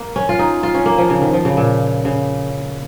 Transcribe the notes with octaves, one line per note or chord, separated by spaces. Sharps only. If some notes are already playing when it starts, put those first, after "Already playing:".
Already playing: A#3
C#4
F4
D#4
F4
C#4
A#3
F3
C#3
D#3
F3
C#3
A#2
C#3